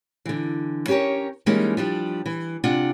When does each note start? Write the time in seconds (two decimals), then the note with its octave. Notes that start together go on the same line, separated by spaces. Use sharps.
0.25 D3 E3
0.88 C#4 G4 G#4 A#4 C#5
1.46 E3 G3 G#3 A#3 C#4 D#4
1.77 F3 G3 D4
2.26 E3
2.64 C3 D4 F4 D5 F#5